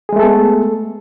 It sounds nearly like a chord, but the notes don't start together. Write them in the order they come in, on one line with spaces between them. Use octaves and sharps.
G#4 G#3 A3 A4 B3